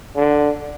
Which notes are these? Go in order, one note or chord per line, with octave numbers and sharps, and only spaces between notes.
D3